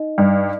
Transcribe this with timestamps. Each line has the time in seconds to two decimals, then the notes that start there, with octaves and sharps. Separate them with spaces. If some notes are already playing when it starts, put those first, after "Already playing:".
Already playing: D#4 D#5
0.18 G2